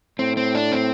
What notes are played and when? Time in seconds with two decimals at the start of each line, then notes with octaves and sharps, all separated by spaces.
0.19 A2 C4
0.37 C4
0.55 D4
0.72 C4